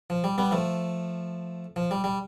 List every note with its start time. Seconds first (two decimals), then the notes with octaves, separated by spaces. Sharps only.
0.10 F3
0.24 G3
0.38 G3 B3
0.51 F3 A3
1.76 F3
1.91 G3
2.04 G3